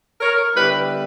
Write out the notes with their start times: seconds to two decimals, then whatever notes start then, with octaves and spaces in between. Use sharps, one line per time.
0.20 A#4 C#5
0.55 D3 G3 B3 E4 G4 B4